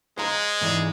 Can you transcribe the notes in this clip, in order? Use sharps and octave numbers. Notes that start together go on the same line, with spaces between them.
G#3 C5 F5 A#5
G#2 E3 D5